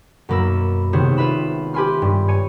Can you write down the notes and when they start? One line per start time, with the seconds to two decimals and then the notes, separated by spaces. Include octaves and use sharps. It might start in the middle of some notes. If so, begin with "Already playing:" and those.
0.29 F#2 B2 A#3 B5 E6
0.93 G#1 C3 B3 C5 C#5 D#6
1.17 F4 B4 E5 B5 E7
1.74 G4 B4 G#5 B5 C6 F6
2.02 G2
2.28 C#5 G#5 C#7 D#7